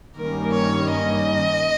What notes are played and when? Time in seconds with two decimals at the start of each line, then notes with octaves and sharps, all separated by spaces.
0.16 G2 D#3 G3 A#3 C#4 A#4
0.54 C#5
0.92 D#5